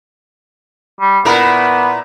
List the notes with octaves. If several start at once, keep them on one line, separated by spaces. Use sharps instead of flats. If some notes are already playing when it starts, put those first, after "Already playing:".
G3
A#2 B3 E4 A#4